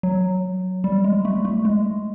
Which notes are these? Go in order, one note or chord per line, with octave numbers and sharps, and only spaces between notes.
F#3
G3
G#3
A3
A3
G#3